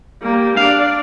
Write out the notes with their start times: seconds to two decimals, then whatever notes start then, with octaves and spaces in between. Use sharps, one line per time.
0.22 G3 A#3
0.57 D4 D5 F5